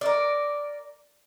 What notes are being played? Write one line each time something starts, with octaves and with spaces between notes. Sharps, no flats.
A#4 D5